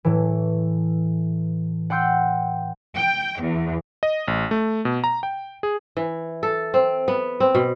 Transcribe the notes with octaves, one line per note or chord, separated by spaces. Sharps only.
A2 E3
F#5 G5 C6 E6 G6
G5
E2
D#5
A1
A3
B2
A#5
G5
G#4
E3
A4
C4
B3
C4
B2